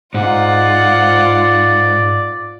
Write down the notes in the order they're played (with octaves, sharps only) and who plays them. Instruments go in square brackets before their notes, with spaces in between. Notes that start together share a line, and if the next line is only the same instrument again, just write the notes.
[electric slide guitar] G#2 [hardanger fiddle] F4 F#5 [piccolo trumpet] D5